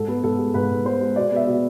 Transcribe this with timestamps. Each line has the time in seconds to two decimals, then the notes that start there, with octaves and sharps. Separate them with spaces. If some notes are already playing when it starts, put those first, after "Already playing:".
Already playing: G#2 A4
0.08 B3
0.23 G#2 A4
0.39 G#3
0.54 G#2 B4
0.70 G#2
0.85 B3 C5
1.01 G#3
1.16 B2 D5
1.32 B3 E5
1.47 B2